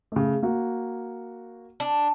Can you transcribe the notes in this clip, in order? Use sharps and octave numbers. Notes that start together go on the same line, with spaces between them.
C#3 A3
A#3 F#4
D4